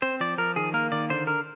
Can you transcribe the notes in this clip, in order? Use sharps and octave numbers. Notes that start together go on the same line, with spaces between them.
C4 C5
F3 D5
F3 A#4
D#3 G#4
A#3 A#4
D#3 D5
D3 C5
D3 A#4